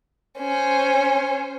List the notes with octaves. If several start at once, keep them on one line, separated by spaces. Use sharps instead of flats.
C#4 C5